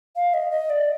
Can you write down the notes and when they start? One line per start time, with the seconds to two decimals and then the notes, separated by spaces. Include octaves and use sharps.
0.16 F5
0.34 D#5
0.51 D#5
0.70 D5